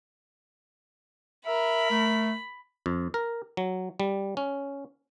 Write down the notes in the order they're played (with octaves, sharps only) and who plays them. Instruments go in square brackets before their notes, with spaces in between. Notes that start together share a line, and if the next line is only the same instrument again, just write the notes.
[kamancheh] A#4 [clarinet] E5 [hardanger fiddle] B5
[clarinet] A3
[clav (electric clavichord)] F2
A#4
F#3
G3
C#4